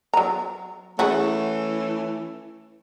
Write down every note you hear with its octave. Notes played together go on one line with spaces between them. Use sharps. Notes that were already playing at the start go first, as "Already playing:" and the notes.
F#3 A#5
E3 A3 C#4 E4 F#4 G#4